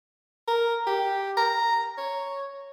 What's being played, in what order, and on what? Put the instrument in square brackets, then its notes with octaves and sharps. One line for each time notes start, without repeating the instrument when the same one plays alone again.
[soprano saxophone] A#4
G4
A#5
C#5